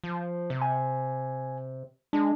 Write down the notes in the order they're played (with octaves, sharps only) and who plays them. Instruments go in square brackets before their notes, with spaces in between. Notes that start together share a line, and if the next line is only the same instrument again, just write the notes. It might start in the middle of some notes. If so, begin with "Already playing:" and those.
[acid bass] F3
C3
[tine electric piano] G#5
[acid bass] G#3 [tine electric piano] D4